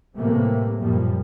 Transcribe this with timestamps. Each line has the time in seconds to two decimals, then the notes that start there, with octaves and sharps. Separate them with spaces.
0.17 A2 C3 E3 G3 A3 A#3
0.78 F#2 A#2 F3 G3